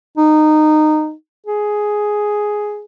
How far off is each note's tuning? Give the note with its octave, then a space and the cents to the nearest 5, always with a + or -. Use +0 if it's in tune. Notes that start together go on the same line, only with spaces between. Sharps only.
D#4 -20
G#4 +5